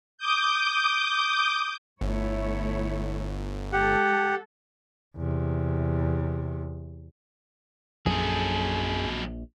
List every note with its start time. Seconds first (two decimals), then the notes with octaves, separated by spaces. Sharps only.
0.18 D6 D#6 G6
2.01 G1 A3 E4 C#5
3.73 G#3 G4 A4 F#5
5.17 E2 C3
8.06 A#1 F#2 F#3 G#4 A4